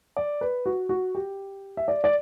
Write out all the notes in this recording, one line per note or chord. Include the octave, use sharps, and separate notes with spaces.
D5
B4
F#4
F#4
G4
E5
D5
D5